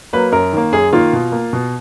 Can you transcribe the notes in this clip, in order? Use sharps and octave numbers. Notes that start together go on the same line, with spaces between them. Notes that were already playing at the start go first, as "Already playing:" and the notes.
F#3 A#3 B4
F#2 A#4
D#3 A#3
F#2 G#4
D#3 A#3 F4
B2
A#3
B2